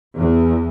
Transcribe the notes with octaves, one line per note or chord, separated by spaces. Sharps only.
E2